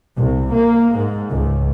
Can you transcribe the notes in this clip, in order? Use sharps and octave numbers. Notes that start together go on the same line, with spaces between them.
C2
A#3
G#2
C#2